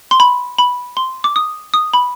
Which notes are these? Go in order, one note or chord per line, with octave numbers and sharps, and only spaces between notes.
C6
B5
B5
C6
D6
D#6
D#6
B5